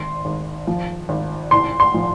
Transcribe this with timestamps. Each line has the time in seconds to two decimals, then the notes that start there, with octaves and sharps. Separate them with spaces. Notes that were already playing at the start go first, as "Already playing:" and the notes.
Already playing: G#1 C6
0.25 G#1
0.67 F3
1.09 G#1
1.51 C2 C6
1.80 C6
1.94 F3